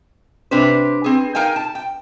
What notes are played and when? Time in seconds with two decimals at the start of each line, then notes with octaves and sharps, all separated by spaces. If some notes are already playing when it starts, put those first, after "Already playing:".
0.51 C3 D4 G4 B4 C5
1.04 C4 G#4
1.35 D#4 A#4 F5 G5 G#5
1.56 A5
1.75 G5